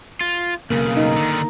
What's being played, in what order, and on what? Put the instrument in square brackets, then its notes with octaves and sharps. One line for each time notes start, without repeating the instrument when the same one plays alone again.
[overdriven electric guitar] F4
[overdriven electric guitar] B1 C#3 [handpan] A#3
[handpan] D#4
[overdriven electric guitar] D3 D#3